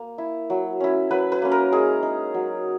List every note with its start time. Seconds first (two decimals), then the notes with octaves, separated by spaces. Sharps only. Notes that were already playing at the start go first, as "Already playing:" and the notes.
Already playing: A#3
0.18 E4
0.50 F#3
0.80 C#4 E4
1.11 F#3 B4
1.32 B4
1.42 A#3 C#4
1.52 A#4
1.72 G#3 G#4
2.03 D#4
2.34 F#3